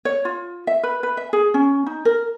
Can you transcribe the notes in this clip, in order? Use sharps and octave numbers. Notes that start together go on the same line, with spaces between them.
C#5
F4
E5
B4
B4
E5
G#4
C#4
D#4
A#4